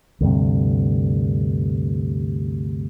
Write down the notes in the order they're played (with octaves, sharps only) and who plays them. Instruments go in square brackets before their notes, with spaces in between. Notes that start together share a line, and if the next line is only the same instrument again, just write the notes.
[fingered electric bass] D2 G2 C3